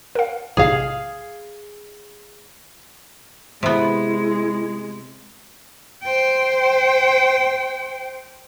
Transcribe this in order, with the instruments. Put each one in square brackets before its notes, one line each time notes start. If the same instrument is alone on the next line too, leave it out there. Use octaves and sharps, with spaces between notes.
[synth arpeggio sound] A#4 F5
[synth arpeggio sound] A#1 G#2 C3 [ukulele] G#4 F5
[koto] C3 B3 [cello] G#3 [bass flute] E4
[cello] C5 G5